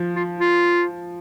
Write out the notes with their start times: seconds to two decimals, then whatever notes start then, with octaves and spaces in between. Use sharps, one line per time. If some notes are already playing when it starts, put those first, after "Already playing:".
Already playing: F3
0.15 F4
0.40 F4